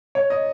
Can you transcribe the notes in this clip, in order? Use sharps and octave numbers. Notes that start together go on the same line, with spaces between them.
C#5
D#5